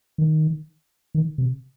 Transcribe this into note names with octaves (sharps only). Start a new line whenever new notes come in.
D#3
D#3
C3